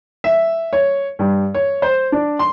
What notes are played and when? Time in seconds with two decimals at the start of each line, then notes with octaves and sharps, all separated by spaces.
0.24 E5
0.73 C#5
1.19 G2
1.54 C#5
1.82 C5
2.12 D4
2.39 C6